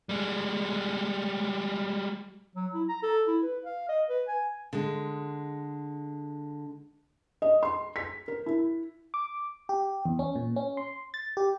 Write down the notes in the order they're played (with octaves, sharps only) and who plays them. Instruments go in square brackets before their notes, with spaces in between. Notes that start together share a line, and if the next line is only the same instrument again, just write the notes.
[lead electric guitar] G3 G#3
[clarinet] F#3
E4
A#5
A4
E4
B4
F5
D#5
B4
G#5
[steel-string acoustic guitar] D3 G#3
[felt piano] D#5
C6
B6
A#4
E4
[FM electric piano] D6
G4
E2
C#4
A#2
C#4
C6
A6
G4